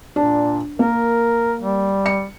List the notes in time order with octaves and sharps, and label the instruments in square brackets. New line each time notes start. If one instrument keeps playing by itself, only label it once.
[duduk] A#2 [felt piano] D4
[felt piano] A#3 [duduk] A#4
[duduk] G3
[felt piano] C#7